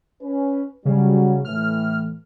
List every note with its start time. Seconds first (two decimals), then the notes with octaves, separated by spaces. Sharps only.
0.22 C#4 B4
0.85 C#3 F#3 G3
1.45 A2 E3 A3 F6